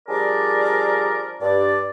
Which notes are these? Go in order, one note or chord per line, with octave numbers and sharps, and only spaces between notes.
F3 G3 D4 G#4 A#4 D5
G2 D5